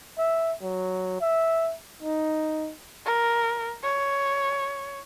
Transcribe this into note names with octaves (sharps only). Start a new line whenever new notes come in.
E5
F#3
E5
D#4
A#4
C#5